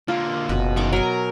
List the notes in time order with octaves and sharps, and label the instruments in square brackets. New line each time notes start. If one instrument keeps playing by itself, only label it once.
[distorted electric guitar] D3 A#3 [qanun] F4
[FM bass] F#1 [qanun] B2
[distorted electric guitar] D#3 F4 [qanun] B3 C#6 D6
[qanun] F#3 G#5 [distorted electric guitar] A#4